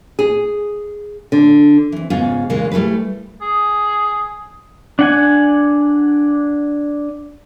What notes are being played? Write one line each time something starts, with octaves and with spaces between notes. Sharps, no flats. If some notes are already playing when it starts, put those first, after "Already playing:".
G#4
D3
E3 C4
G#2 C#3 B3 F4 G#4
A#2 C#3 E3 G#3
G3 A3 E4 G#4 B4
G#4
D4 F#5 G#5